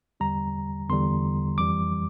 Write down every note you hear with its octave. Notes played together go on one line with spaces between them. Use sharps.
E2 D3 G3 A#5
E2 D3 G3 C6
F2 E3 G3 D6